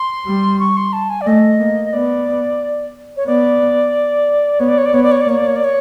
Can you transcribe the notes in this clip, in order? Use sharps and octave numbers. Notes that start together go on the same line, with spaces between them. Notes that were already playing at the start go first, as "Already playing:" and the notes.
Already playing: C6
G3
C#6
C6
A5
G#5
D5
A3 D#5
A#3
D#5
B3 D5
C#5
B3 D5
B3 C#5
D5
C#5
D5
B3 C#5
D5
C#5
D5
A#3 C#5
D5
C#5
D5
C#5